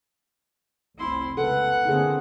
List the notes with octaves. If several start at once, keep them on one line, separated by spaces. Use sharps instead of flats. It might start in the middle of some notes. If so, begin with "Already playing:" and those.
F1 C2 C4 E4 C6
C#2 B3 A4 B4 F#5
D3 A#3 C4 E4 G#4